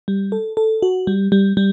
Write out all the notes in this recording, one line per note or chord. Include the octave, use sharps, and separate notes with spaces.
G3
A4
A4
F#4
G3
G3
G3